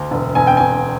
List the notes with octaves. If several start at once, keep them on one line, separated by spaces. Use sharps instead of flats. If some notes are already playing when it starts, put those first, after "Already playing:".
Already playing: D2
E1
E1 G#5
G5
E1 G#5